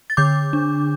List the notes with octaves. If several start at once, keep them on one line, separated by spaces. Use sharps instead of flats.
A6
D3 D6 G6
D4